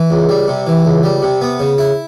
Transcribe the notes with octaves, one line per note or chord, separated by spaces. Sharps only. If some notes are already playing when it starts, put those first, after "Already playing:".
Already playing: E3
C#2
G3
C3
E3
C#2
G3
C3
B3
C#3
E4